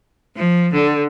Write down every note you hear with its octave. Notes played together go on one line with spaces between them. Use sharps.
F3
D3